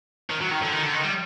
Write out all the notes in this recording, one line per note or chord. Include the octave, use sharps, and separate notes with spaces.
D#3
F#3
D#3
D3
D#3
D3
D#3
G3